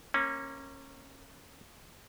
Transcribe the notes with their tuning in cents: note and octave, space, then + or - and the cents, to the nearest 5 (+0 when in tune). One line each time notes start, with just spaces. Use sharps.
A#3 +0 C#4 -25